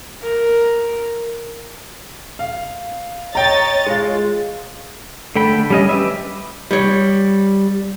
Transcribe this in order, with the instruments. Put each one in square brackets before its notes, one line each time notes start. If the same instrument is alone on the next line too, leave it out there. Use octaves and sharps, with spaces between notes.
[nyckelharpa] A#4
[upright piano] F5
[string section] C#5 D#5 A6 [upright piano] G5 A#5
[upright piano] G#3 F4
[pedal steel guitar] D3 A3 G5 B5
G3 C#4 D#5
G4 B4 E5
[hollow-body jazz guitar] G3 C#5